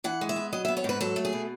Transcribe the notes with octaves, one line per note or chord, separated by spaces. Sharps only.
E3 F#5
G#3
E5
B3
F#3 D#5
E5
B3
C#5
G#2 B4
F#3 A4
A3
G#4
B2